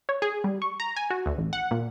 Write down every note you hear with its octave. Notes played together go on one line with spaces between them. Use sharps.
C#5
G#4
G3
C#6
A#5
G#5
F#4
D2
A1
F#5
A#2